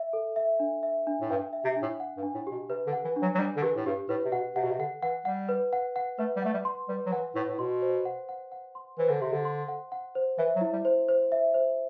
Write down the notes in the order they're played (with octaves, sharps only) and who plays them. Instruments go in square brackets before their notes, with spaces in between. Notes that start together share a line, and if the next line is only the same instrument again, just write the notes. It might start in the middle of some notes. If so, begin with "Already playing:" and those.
Already playing: [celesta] E5
A4
E5
D4
E5
D4
[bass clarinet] A2
[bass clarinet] G2 [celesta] G5
[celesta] E5
[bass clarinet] C3
[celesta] D4
[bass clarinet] A2
[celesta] F#5
[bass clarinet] G2
[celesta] D4
[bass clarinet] A2
[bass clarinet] B2 [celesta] G4
[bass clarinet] C3 [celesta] B4
[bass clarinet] D3
[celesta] F#5
[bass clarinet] E3
[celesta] D4
[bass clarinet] F#3
F#3
[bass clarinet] G3 [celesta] D4
[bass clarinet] D3
[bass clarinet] E3 [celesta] G4
[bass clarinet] A2
[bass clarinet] G2 [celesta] G4
[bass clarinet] A2 [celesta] B4
[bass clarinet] C3
[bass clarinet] B2 [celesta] F#5
[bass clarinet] C3 [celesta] F#5
[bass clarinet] B2
C3
[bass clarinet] D3 [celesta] F#5
[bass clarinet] E3 [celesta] F#5
[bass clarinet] G3 [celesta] F#5
[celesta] B4
F#5
F#5
[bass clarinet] A3 [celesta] B4
[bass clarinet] G3
[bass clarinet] A3 [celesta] F#5
[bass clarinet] G3
[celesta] C6
[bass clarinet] G3 [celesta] B4
[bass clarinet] F#3
[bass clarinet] E3 [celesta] F#5
[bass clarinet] A2 [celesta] B4
[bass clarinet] A2
[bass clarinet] B2 [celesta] C6
[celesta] C5
F#5
F#5
F#5
C6
[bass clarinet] E3 [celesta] C5
[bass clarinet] D3
[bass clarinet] C3 [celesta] C6
[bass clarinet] D3
[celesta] C6
F#5
F#5
C5
[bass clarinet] E3 [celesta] E5
[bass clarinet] F#3
[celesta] E4
[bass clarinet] G3
[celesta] C5
C5
E5
C5